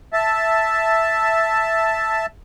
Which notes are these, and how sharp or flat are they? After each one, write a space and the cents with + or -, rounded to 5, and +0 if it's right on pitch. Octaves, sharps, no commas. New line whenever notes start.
E5 +0 A5 +0